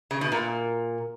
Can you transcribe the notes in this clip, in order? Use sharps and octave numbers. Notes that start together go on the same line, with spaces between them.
C#3
B2
A#2